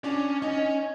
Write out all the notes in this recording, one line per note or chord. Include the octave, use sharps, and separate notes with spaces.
C#4 D4 D5
C#4 D#4 D#5